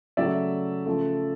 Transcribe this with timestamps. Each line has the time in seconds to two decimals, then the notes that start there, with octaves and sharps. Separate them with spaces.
0.17 C#3 F#3 A3 D5 E5
0.86 C#3 F3 A3